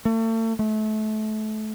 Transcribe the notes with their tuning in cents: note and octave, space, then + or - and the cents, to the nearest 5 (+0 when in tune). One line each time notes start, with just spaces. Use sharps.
A3 +35
A3 -30